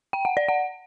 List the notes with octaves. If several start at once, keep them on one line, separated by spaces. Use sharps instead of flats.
G5
F#5
D5
F#5